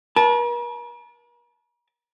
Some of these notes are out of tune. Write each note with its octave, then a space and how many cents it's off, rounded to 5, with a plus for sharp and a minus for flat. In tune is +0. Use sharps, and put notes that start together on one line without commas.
A#4 +45 A5 -20